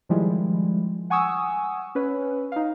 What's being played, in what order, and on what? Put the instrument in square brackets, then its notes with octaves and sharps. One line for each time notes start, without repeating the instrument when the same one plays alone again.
[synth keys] D#3 F3 G3 G#3 E4
F#5 G#5 C#6 D#6 E6
C#4 B4 C#5
D#4 F5